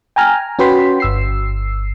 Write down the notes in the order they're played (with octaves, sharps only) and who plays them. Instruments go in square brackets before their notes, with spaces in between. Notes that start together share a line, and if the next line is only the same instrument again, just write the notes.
[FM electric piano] G5 G#5 A#5 F6
C#4 F#4 B4 G5 C6 B6
G1 E6 C7